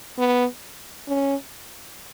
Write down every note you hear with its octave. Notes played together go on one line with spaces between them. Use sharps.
B3
C#4